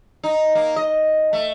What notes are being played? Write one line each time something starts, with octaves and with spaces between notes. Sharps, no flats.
D#4
A#3
D#5
A3